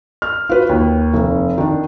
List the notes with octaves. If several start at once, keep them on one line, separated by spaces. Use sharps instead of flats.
F6
F4 F#4 B4
D#2
F1
D#3 D4